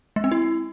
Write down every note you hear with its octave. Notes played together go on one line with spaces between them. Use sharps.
G#3
C4
E4